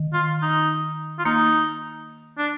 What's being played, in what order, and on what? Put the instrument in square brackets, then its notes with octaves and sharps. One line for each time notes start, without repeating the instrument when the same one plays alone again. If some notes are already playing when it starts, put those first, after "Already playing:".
Already playing: [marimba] D#3
[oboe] F4
D#4
F4
[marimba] A#3 [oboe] D#4
[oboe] D4